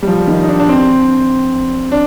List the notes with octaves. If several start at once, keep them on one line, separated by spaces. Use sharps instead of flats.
G3
F3
D#3
D#4
D4
D4
C4
D4